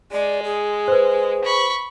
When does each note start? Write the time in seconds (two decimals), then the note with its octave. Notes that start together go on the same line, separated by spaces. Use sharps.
0.12 G#3 D5
0.44 G#4
0.88 B4 C5
1.44 B5 C#6